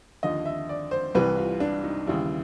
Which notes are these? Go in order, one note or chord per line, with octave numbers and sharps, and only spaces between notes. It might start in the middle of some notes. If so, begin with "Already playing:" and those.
D#2 D3 F3 D#5
E5
D5
C5
C2 C3 E3 G3 B4
F4
D4
D#4
D#2 C#3 E3 G3 E4